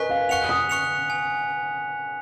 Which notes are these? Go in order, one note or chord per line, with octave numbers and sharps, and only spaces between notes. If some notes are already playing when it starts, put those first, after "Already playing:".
Already playing: A#4 B4 D#5 G#5 C#6 F#6 B6
F5
F#5 C#6 F#6 C#7 F7
D#6
C#6 F#6 C#7 F7
G#5